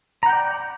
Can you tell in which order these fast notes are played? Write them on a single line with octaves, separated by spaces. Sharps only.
A#5 F#5 G5 D5